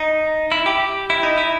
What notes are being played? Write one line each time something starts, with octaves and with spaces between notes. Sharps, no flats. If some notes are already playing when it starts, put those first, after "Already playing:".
Already playing: D#4
E4
G4
E4
D#4
E4